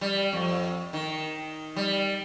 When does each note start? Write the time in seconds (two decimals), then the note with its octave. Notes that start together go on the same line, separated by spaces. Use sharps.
0.01 G3
0.33 F2
0.93 D#3
1.76 G3